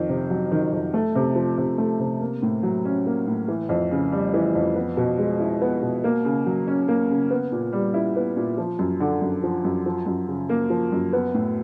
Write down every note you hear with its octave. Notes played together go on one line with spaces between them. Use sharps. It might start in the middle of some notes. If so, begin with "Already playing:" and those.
Already playing: F2 D#3
C3
F#3
D#3
F2
A3
C3
F3
C3
A3
C3
A#3
A2
F#3
C#4
A#3
A2
E3
F2
C#3
G3
E3
F2
B3
B2
G#3
E4
B3
B2
A#3
C#3
F#3
C#4
A#3
C#3
B3
A#2
G3
E4
B3
A#2
F3
F#2
D3
F#2
F3
F#2
F3
F#2
C#3
A#3
F3
F#2
B3
A2